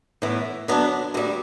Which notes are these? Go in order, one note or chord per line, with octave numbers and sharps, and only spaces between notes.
A2 E3 B3
D3 F#3 B3 D4
D2 D3 G3